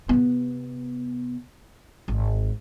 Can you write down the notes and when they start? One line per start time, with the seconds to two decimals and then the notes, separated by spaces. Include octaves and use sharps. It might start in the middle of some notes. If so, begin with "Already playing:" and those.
0.09 C3 B3
2.08 G#1